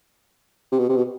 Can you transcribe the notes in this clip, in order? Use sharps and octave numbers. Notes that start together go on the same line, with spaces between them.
C3
B2
C3
B2